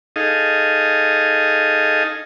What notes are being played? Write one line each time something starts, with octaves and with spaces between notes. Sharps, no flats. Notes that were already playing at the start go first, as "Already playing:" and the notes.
D#4 G#4 A4 D#5 F5